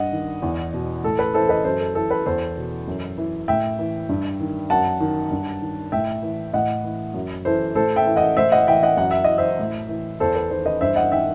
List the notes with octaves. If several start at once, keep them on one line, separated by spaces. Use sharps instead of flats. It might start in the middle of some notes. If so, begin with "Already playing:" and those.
Already playing: G2 D#5 F#5
D#3
E2
B2
A2 A4
B4
E3 A4 C5
B4 D#5
F#2 A4 C5
A4
E3 A4
B4
E2 A4 C5
B2
F#2
E3
A2 E5 G5
E3
G2
D#3
F#2 F#5 A5
D#3
G2
D#3
A2 E5 G5
E3
A2 D#5 F#5
E3
F#2
E3 A4 C5
A2 A4 C5
E5 G5
E3
D#5 F#5
A2 C5 E5
D#5 F#5
E3 E5 G5
D#5 F#5
F#2 F#5
E5
E3 D#5
C5 E5
A2
E3
E2 A4 C5
B4
D#3 A4 C5
B4 D#5
G2 C5 E5
D#5 F#5
D#3 E5 G5